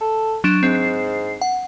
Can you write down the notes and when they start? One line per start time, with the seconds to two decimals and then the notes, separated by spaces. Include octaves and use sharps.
0.01 A4
0.44 F#3 D4 E7
0.63 G#2 C4
0.75 C7
1.41 F#5